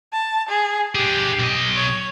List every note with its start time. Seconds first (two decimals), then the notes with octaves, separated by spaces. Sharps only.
0.13 A5
0.49 G#4
0.95 D4 G4 G#4
1.39 B1 D#5
1.76 C#5